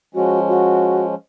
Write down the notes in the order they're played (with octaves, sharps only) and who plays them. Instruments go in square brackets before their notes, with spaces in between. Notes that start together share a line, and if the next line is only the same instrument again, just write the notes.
[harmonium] F3 G#3 C#4 [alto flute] F#4
[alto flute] F#4